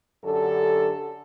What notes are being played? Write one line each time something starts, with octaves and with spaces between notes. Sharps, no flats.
F#2 D3 G4 A4